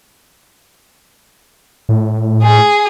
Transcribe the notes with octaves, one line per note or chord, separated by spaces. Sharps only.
A2
G#4